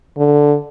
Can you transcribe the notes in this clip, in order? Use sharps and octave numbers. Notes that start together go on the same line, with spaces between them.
D3